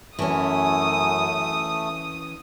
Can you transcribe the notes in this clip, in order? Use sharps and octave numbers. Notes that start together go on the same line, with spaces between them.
F#2 E3 A3 C#4 D#6